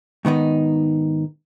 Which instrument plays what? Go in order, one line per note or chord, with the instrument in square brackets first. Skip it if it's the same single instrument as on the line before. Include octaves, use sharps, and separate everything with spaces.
[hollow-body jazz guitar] G#2 D#3 B3 D#4